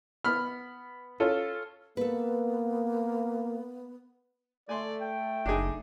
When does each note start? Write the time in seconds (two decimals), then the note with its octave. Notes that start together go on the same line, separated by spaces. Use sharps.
0.25 B3 B5 F6
1.20 C#4 F4 A4
1.97 A#3 B3 A4 B4
4.69 A3 D5 G#5 C6
5.01 G5
5.46 F#1 D4 D#4 G#4